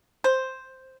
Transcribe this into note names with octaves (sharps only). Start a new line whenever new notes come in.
C5